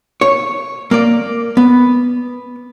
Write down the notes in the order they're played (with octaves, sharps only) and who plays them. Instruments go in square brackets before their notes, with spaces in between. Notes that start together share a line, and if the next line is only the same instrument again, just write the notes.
[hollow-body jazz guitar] C#5
A#3 D5
B3